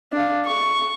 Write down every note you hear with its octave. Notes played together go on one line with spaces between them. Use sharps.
D4 F5
C#6